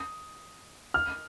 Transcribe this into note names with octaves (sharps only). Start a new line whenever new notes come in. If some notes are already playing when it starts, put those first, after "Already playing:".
Already playing: D#6
F6